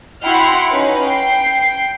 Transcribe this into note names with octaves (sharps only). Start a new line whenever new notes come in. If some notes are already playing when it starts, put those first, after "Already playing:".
E4 F#4 F#5 G5 C6 F6
C#4 D#4 B4
G5 C7